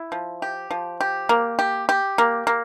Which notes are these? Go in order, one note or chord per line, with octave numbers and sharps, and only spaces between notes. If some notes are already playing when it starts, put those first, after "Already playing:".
Already playing: E4
F3
G4
F3
G4
A#3
G4
G4
A#3
A#3